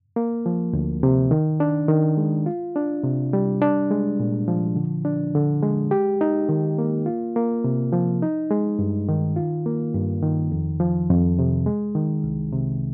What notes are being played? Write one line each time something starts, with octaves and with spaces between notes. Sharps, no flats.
A#3
F3
D2
C3
D#3
D4
D#3
G#3
F4
D4
C3
G3
D4
G#3
A#2
F3
D3
D4
D3
G#3
G4
D#4
D#3
A#3
F4
A#3
C3
F3
D#4
G#3
G2
D#3
F4
A#3
G2
D#3
F2
F3
F2
C3
G#3
D#3
C2
C3